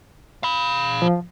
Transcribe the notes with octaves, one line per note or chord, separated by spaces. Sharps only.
F5 B5
F3